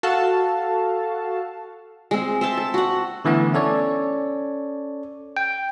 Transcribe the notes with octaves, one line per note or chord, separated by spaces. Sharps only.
F#4 A4 F5 A5
G#3 C4
C5 E5 A5
A4
F#4 F#5
D3 E3 A3 B3
C#4 A4 C#5 D5
G5